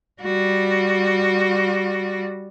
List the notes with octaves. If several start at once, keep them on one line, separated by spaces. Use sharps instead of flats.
G3 F#4